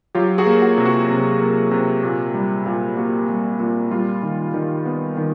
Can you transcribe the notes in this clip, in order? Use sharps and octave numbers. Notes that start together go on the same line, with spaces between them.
F#3 F4 G4
F#4 G#4
A#3
F#4
C3
F#4
C3
A#3
C3
A#2
G3
A#2
A#3 F#4
G3
A#2
G3 F4
D#3
D#3
B3
D#3